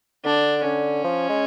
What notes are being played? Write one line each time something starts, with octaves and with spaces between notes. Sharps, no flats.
D3 D4
D3 C#4
F3
G#3